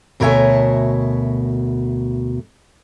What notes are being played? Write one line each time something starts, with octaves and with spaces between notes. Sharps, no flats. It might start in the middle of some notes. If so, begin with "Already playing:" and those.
D2 B2 A#4 C#5 E5 G#5